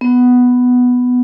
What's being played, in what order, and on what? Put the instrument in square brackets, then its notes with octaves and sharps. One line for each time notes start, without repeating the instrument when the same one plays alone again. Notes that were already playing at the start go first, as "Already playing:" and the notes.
[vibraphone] B3